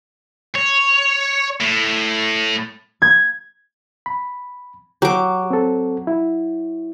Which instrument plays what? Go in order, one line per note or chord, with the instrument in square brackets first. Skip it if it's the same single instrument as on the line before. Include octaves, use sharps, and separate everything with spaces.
[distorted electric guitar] C#5
A2
[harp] G#6
[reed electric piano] B5
[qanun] F#3 D6 [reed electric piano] G4
[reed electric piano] C4 A4
E4